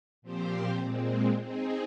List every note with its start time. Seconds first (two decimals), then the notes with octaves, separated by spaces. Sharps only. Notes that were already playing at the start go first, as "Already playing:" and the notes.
0.22 A#2 F3 C4 G4 C5
0.81 A#2 G#3 C4
1.40 C4 D#4 G#4